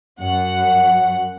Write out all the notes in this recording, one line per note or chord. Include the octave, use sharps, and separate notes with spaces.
F#2 F#5